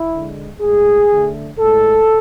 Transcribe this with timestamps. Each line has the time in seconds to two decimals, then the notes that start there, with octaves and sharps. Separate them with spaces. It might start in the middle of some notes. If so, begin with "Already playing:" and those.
Already playing: E4
0.11 D3 G#3
0.60 A2 G#3 G#4
1.10 D3 A3
1.58 A2 G#3 A4